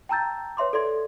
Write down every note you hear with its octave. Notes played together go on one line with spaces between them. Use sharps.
G5 A5 A#5 E6 G6 A6
B4 C#5 E5 C6 D6
A4 D5 E5 C6 G#6